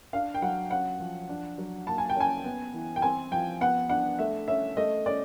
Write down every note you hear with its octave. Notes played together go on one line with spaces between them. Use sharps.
D4 F5
G5
F#3 F#5
C#4 F#5
F3
D4
F#3
A#3 A5
G#5
G5
C#4 G#5
B3
E3
G5
C4 G#5
F3 G5
B3 F#5
D4 F#5
A3 E5
C#4 E5
A3 D#5
C#4 D5